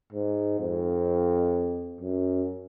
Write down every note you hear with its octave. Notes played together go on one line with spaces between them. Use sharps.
G#2
F2
F#2